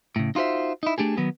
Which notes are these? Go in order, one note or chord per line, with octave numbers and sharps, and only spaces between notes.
A2 C#3
D#4 F4 F#4 C5 E5
D#4 E4
A3 D4 G4 G#4
D#3 F#3 B3